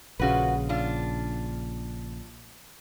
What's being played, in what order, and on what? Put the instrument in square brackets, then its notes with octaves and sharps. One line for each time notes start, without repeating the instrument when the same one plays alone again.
[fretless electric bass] A#1 C#3 [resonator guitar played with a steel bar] F4 F#4 B4
[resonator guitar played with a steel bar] D4 F4